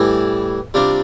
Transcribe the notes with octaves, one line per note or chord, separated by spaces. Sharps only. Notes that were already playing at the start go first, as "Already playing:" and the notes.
Already playing: A2 E3 G3
C3 G3 D4 F4